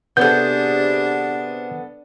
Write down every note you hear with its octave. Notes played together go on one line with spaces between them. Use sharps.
C3 B3 D4 G#4 A4 G6